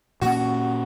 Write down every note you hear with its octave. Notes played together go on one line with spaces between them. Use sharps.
A#2 G3 A#3 C#4 F#4